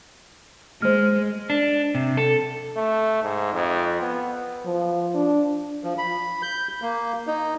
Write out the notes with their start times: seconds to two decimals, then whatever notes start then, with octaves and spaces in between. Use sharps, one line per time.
0.82 G#3 C5 F6
1.50 D4
1.95 C3
2.17 A4
2.76 A3
3.23 G#2
3.53 F2
4.01 B3
4.66 F3
5.14 D4
5.84 F3
5.98 B5
6.42 G6
6.82 A#3
7.27 D#4